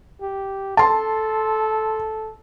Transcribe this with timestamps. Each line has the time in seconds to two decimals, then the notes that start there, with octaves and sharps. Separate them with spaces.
0.22 G4
0.77 A4 A5 C6